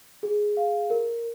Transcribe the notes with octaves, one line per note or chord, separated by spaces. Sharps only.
G#4
F5
A#4